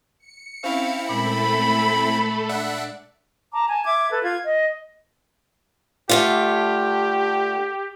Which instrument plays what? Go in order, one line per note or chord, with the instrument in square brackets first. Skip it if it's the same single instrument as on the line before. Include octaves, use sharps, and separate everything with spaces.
[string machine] C#7
[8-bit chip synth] C4 E4 [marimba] C#4 [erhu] F5
[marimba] A#2 G#3 [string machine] A3 A4 [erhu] B5
[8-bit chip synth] D4 E5 F#5 [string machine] D5
[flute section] A5 A#5 D6
G#5 A5
E5 D6 G#6
A4 B4
F4 G#6
D#5
[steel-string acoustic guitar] D3 A3 F4 [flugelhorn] G4